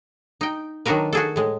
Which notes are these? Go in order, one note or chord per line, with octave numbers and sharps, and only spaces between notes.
D#4 G5
D#3 F#3 D4 F#4 A#4 B4
F#4 G#4 A4
A2 G#3